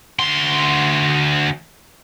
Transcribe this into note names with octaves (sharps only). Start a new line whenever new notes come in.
D2 C6